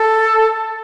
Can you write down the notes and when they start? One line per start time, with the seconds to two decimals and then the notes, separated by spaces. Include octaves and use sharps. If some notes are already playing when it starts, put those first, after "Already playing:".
Already playing: A4